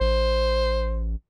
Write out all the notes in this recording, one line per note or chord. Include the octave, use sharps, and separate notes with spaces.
A1 C5